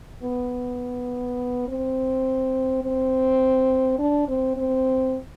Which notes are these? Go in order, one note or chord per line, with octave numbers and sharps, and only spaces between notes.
B3
C4
C4
D4
C4
C4